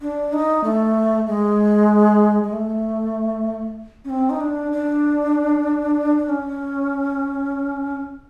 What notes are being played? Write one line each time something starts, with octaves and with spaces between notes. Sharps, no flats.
D4
D#4
A3
G#3
G#3
A3
C#4
C4
D#4
D4
D4
D4
C#4